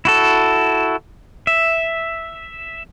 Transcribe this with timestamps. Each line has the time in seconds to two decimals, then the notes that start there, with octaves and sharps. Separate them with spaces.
0.05 E4 F#4 A4
1.47 E5